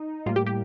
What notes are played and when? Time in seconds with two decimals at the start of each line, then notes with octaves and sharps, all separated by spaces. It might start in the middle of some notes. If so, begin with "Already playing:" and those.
Already playing: D#4
0.26 A2 G3 A#3 F4
0.36 G4
0.46 G4